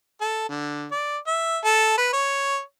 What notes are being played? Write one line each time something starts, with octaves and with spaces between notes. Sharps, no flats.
A4
D3
D5
E5
A4
B4
C#5